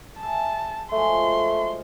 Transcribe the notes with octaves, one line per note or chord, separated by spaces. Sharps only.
G#4 E5 A5
F3 F#3 G#3 A3 C6